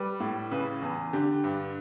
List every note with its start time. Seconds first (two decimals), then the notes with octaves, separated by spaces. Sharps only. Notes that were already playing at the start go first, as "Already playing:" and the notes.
Already playing: G3 B4
0.20 A2
0.51 C#3 B4
0.82 E2
1.13 D3 G4
1.44 G2